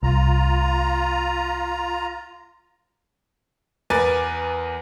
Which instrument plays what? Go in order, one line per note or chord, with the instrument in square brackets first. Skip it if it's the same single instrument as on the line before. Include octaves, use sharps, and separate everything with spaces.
[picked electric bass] C2 [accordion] F4 A#5
[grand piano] E2 A#4 B4 G#5 D6 A6